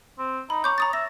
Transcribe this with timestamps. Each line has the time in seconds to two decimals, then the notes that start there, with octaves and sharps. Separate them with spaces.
0.19 C4
0.50 D#4 B5
0.64 C#5 A#5 D6 G6
0.78 A#5 D#6 A6
0.93 E5 A#6